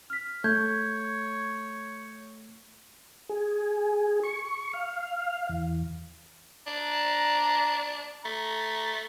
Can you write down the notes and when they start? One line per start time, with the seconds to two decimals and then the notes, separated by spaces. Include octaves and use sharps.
0.10 F6 B6
0.44 A3 C#5 G6 G#6
3.29 G#4
4.23 C#6
4.73 F5
5.49 E2
6.67 D4 A#5
8.25 A3 A#5